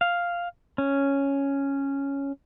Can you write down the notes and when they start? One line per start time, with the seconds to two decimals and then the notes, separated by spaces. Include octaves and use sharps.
0.01 F5
0.78 C#4